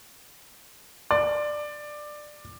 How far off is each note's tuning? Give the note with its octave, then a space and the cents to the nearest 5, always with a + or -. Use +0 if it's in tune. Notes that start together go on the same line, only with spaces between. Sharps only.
D5 +15